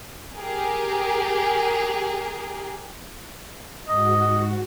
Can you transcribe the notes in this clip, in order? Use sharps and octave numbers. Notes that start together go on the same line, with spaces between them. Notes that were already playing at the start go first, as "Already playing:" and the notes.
G4 G#4 A#4
G#2 F#4 D#5